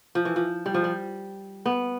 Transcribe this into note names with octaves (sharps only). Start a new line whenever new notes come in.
F3
E3
F3
G3
F3
G3
B3